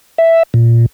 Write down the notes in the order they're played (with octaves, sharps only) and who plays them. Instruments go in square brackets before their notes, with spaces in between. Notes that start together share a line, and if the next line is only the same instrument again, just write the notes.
[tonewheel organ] E5
A#2